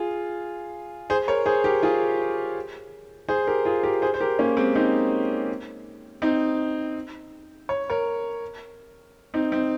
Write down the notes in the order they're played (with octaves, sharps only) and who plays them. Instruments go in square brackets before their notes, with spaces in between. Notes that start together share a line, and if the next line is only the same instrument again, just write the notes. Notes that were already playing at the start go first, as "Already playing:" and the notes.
Already playing: [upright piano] F4 G#4
G#4 C5
A#4 C#5
G#4 C5
G4 A#4
F4 G#4
G#4 C5
G4 A#4
F4 G#4
G4 A#4
G#4 C5
C5
G4 A#4
A#3 C#4
G#3 C4
C4 D#4
C4 D#4
C#5
A#4 C#5
C4 D#4
C4 D#4